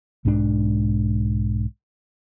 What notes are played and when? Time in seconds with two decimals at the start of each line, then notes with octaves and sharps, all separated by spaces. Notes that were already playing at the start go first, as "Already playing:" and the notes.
0.25 B1 G#2 G#3 D4